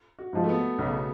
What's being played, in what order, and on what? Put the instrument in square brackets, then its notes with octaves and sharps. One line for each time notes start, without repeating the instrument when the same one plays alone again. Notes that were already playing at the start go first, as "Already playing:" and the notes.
[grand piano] F#4
[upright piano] G#2 F3 G#3
[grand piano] A3
B3
[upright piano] B1 [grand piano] C#3